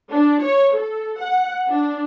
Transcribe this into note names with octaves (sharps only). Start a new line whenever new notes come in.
D4
C#5
A4
F#5
D4